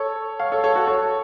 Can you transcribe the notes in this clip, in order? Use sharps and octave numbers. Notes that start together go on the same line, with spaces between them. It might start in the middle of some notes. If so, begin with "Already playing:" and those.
Already playing: A4 C#5
C#5 F5
A4 C#5
A4 C#5
F#4 A4
A4 C#5